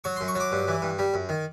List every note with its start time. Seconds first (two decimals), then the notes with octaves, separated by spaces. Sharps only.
0.04 F#3 C#6
0.16 F#2 C6
0.28 C#6
0.35 F#3 D6
0.52 G2
0.68 E3
0.82 G2
0.99 G3
1.14 F#2
1.29 D#3